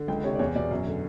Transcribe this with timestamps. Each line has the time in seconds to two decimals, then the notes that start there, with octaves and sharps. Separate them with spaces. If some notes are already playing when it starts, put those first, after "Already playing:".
Already playing: D3
0.08 C#2 G5
0.24 C3 C#5
0.35 D5
0.39 E2 C#5
0.55 B2 D5
0.71 F#2
0.87 D3